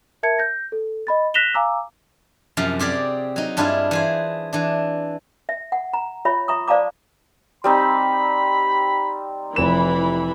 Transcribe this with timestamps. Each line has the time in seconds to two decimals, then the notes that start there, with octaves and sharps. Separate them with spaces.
0.23 A#4 E5 A5 G#6 C#7
0.39 G6 A#6
0.72 A4
1.07 D#5 B5 A6
1.34 F#6 A#6 B6 E7 F7 G7
1.54 F5 G#5 A#5 D6 E6
2.57 F#2 C3 F3 F5 A#5
2.79 C4 G4 G#4 D5
3.36 F#3 D#4
3.57 G2 D4 E4 F4 G#4
3.91 E3 G#4 C5
4.53 E3 D4
5.49 E5
5.72 F#5
5.93 A#5
6.25 F4 C#5 E5 B5
6.48 E5 A#5 C#6 D#6
6.68 C5 D5 F5 A5 A#5 D6
7.64 G3 C4 D#4 B5
9.56 F1 E3 B5 E7